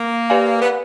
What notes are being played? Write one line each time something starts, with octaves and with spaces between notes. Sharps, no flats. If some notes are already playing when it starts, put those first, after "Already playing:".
Already playing: A#3
G4 B4 D5 F5 G#5
B3